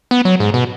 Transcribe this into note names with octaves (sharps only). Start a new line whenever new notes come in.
B3
F#3
G#2
B2